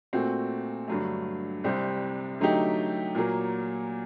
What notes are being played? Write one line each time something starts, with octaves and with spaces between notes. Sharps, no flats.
A#2 A3 C4 F#4
G2 D3 F#3 A3
C2 C3 G3 C4
D3 F#3 A3 D#4 G4
A#2 F#3 A#3